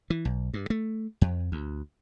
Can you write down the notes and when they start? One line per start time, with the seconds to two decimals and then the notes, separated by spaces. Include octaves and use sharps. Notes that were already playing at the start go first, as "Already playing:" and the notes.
0.10 E3
0.25 B1
0.54 G2
0.70 A3
1.21 F2
1.52 D2